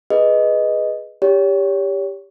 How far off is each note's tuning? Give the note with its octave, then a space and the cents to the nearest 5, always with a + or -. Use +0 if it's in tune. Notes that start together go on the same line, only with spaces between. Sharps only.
G#4 +10 B4 +0 D#5 +0
G4 +15 C#5 +35